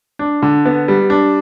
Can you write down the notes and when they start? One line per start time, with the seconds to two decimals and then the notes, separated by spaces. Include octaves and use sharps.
0.19 D4
0.42 D3
0.65 B3
0.88 G3
1.10 D4